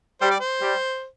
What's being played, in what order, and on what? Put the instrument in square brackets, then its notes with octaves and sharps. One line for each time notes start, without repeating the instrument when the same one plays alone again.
[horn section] G3 [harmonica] C5
[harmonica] D5
C5
[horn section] G3